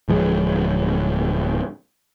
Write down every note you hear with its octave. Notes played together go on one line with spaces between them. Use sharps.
D1 F3 G#3